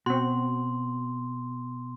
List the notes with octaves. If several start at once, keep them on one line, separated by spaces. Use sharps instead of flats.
B2 C4 F#4 C6